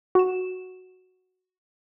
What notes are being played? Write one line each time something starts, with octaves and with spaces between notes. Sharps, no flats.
F#4 E7